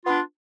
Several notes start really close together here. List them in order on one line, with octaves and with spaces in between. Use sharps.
F4 B3 D4